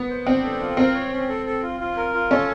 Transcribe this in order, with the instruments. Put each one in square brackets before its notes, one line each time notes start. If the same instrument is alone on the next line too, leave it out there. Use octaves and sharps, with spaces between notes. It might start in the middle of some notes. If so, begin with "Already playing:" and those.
Already playing: [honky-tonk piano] B3
[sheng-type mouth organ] C5
[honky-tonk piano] C4 [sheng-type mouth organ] D4
[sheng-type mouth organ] A4
F4
[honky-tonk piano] C4 [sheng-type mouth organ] A#4
[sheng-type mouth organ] C#5
C#4
A4
A4
F4
F4
A#4
F4
[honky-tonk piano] C#4 [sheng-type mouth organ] A4